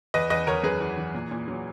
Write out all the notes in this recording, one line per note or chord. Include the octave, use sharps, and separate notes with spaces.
E2 B4 D#5
E2 B4 D#5
E2 A#4 C#5
F#2 G#4 B4
E3
E3
A#2
A#2
F#3